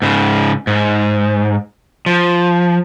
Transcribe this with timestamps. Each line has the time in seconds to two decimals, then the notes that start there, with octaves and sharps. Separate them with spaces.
0.02 G#2 C#3
0.67 G#2
2.06 F3